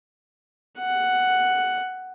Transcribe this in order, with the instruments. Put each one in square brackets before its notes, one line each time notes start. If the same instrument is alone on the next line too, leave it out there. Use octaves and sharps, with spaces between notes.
[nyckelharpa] F#5